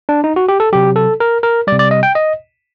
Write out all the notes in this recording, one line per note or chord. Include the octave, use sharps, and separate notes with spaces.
D4
D#4
F#4
G4
A4
C3 F#3 G4
A4
A#4
A#4
C3 G3 D5
D5
D#5
G5
D#5